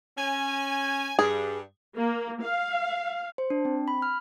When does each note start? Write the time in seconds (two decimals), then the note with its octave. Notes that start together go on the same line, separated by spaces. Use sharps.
0.18 C#4 G#5
1.19 G2 G#4
1.99 A#3
2.42 F5
3.38 C5
3.50 D4
3.65 C4
3.88 B5
4.02 F6